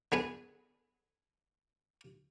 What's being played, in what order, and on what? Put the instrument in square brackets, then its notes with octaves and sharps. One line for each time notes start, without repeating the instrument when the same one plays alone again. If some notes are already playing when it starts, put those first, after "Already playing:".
[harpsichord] D3 B3 G#4 B4